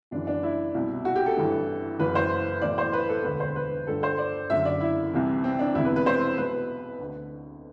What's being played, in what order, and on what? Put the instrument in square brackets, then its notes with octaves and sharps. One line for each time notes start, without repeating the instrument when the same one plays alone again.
[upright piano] F#1 F#2 E3 D4
D4
E4
C2 B2
F#4
G4
A4
A1 G2 E3
F#1 F#2 E3 B4
C5
B1 A2 E3 D5
C5
B4
A4
E1 D2 D3 B4
C5
B4
G1 G2 D3 A4
C5
D5
F#1 F#2 D3 E5
D5
E4
C2 C3 E3
C4
D4
E1 E2 C3 E4
B4
B4
C5
B1 B2 B4
D2 D3